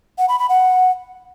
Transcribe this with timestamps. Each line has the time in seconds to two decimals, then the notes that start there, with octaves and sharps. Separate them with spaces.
0.18 F#5
0.29 B5
0.39 B5
0.49 F#5